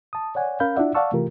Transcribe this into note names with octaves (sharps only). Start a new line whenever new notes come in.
A5 D#6
C#5 D5 F#5 G#5
C#4 A#4 F5 B5 G6
D4 E4 F4 D5 E5 F#5
D5 F5 F#5 A5 C#6 E6
C3 E3 A3 F4 G4 A#4